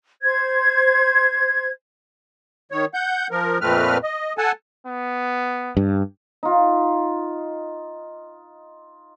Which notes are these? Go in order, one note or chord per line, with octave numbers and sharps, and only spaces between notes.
C5 G#6
D#3 C#5
F#5 G6
F3 A#4
F2 A#2 A3 C4 B4 F6
D#5
A4 F#5 G#5 A5
B3
G2
D#4 F4